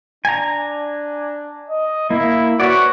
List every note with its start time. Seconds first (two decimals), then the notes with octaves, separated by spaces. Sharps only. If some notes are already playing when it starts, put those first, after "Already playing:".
0.25 D4 G#5 A#5
1.69 D#5
2.10 A#3 E4
2.60 F#4 B4 C#5 D5